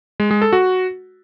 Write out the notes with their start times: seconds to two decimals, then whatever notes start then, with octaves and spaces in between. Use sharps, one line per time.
0.20 G#3
0.31 G#3
0.42 A4
0.53 F#4